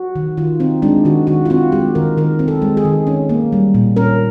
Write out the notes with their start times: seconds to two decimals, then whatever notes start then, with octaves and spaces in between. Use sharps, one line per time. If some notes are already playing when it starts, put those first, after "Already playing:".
Already playing: F#4
0.15 D#3
0.37 D#3 F4
0.60 C4 D#4
0.82 G#3 D4
1.05 D#3 F#4
1.27 D#3 F#4
1.45 F4
1.50 C4 F#4
1.72 G#3 G4
1.95 D#3 A#4
2.17 D#3 A#4
2.39 C4
2.48 A4
2.62 G#3
2.77 G#4
2.85 D#3
3.07 C#4
3.29 A#3
3.53 G3
3.74 A#2
3.96 C#4 A#4